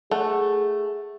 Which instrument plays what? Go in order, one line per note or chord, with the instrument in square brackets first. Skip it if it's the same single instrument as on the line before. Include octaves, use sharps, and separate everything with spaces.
[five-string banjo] A3 [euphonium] G#4 [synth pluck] A4 F#5